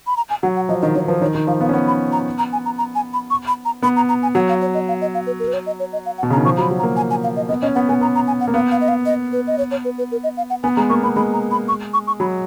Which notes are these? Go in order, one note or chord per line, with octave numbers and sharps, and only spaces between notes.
B5
A#5
G#5
F#3 F#5
F#5
F3 D#5
D#3 D#5
D#3 C#5
F3 B4
D#3 C#5
D#3
F3 F5
B3 F5
C#4
B3 F#5
B5
A#5
A#5
G#5
A#5
A#5
G#5
B5
C#6
B5
A#5
B3 B5
A#5
A#5
G#5
F#3 F#5
F5
C#5
D#5
F5
D#5
F5
B4
A#4
B4
C#5
D#5
C#5
D#5
F5
F#5
B2
C#3 A#5
D#3
F3 C#6
F#3 A#5 B5
F#3
A#5
A#3
G#5
G#5
F5
D#5
B3 D#5
C#4 D#5
B3 F#5
B3 G#5
B3 A#5
A#5
G#5
F#5
A#3
B3 F5
F5
D#5
F5
D#5
B4
D#5
C#5
C#5
B4
B4
A#4
D#5
F5
F#5
B3 G#5
G#3 A#5
A#3 C#6
B3 B5
G#3 B5
A#5
B5
C#6
C#6
C#6
F#3 B5